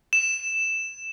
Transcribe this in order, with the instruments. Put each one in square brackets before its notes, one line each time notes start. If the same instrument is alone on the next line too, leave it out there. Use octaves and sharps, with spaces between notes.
[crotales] E7